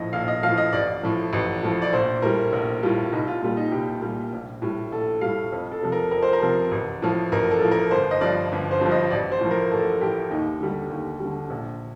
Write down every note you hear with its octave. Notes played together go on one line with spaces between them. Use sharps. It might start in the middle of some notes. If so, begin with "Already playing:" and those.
Already playing: A#1 A2 F3 D#5
A#1 F5
D#5
F3 F5
A2
D#5
A1 D5
A2 F3
A1
A2 F3
D5
A#1 C5
A2 G3 A#4
A#1
A2 G3 F4
C2 D#4
F4
A#2 G3 F4
D#4
C2 G4
A#2 G3
A#1
A2 G3
A#1 A4
A2 G3 F5
F2
A4
C3 F3
A#4
F2 A#4
C5
A#4
C3 F3
A1
A2 F3
A1 A#4
A4
A2 F3
A#4
G1 C5
D#5
G2 F3 D5
G1
C5
G2 F3
D#5
A1 D5
C5
A2 F3
A#4
A1 A4
A2 F3 G4
D#2 D#4
D3 G3
D#2
G3
D3
A#1